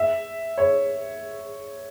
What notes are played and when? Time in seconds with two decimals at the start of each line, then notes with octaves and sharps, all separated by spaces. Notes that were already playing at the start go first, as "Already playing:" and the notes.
Already playing: E5
0.58 C#5